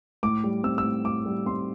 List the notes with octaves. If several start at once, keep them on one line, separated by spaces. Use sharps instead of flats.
A2 D6
G3
C4 E6
E6
A2
A2 D6
G3
C4 C6